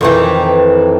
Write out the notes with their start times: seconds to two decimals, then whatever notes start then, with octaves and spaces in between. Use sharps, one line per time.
0.01 F2 D#3 E3